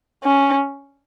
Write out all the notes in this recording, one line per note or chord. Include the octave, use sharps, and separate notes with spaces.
C#4